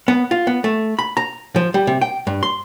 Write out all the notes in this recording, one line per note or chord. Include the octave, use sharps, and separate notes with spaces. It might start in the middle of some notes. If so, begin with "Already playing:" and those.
B3
F4
B3
A3
B5
A#5
F3
G3
C3
G5
G2
C6